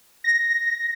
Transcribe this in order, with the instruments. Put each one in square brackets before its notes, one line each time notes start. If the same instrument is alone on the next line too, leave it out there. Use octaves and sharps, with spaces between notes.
[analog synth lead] A#6